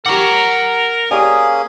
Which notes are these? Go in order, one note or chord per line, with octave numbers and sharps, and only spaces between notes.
G4 A#4 F#5 A#5 C#6 D6
A#3 C#4 G4 G#4 D5 G#5 D#6